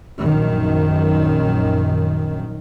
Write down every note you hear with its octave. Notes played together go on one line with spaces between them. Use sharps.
A#1 F#2 D#3